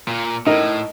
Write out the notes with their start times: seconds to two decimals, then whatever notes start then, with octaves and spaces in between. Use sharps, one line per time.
0.08 A#2
0.46 A2 D#4 A#4